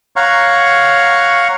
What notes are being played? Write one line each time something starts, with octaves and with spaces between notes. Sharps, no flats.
C#5 F5 F#5 A#5 C#6